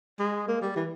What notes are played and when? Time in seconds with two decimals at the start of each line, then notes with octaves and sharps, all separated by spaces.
0.19 G#3
0.48 A#3
0.62 G3
0.76 E3